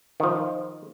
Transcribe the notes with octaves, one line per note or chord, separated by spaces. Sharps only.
D#3 F3